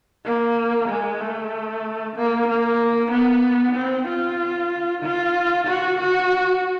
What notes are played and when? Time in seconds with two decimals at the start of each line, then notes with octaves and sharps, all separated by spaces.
0.25 A#3
0.89 G#3
1.21 A3
2.17 A#3
2.48 A#3
3.12 B3
3.76 C4
4.08 F4
5.03 F4
5.67 F#4
5.99 F#4